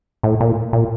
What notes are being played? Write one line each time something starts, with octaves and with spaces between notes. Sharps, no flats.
A2
A#2
A#2